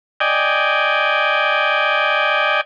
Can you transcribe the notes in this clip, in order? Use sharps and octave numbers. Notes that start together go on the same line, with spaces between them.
D5 D#5 G5 G#5